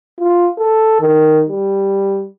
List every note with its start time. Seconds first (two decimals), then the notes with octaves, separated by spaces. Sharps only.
0.20 F4
0.58 A4
1.01 D#3
1.49 G3